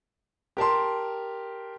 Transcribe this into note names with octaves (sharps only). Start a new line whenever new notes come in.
G4 A#4 A5 C6